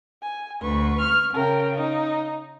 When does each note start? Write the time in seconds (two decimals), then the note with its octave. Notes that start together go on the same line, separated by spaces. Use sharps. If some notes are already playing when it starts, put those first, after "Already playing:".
0.22 G#5
0.62 D2 B4 C#6
1.01 F6
1.34 C#3 A#4 G5
1.77 D#4